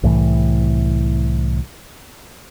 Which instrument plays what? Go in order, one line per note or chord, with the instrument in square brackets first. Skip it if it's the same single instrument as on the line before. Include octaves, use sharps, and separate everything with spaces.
[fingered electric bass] C2 A2 E3